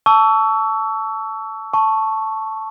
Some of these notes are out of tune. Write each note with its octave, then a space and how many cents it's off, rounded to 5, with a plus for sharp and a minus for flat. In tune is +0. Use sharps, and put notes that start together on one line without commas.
A5 +0 C#6 +30 E6 +0
A5 +0 C#6 +0